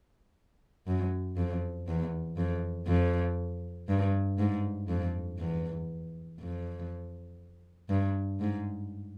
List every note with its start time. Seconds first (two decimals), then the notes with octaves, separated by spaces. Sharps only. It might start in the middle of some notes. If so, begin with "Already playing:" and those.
0.87 F#2
1.37 F2
1.88 E2
2.37 F2
2.87 F2
3.88 G2
4.39 G#2
4.89 F2
5.38 E2
6.40 F2
7.90 G2
8.40 G#2